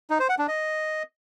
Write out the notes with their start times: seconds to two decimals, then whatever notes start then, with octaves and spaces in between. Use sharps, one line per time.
0.10 D#4
0.20 C5
0.29 F#5
0.39 D4
0.48 D#5